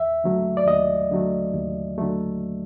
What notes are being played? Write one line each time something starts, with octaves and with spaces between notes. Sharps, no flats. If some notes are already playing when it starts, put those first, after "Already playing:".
Already playing: D#2 E5
D3 F#3 A3
D5
D#2 D#5
D3 F#3 A3
D#2
D3 F#3 A3